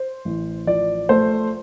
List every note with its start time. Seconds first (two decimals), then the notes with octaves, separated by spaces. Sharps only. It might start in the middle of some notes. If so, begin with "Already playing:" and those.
Already playing: C5
0.25 A1
0.67 F3 D5
1.09 A3 C5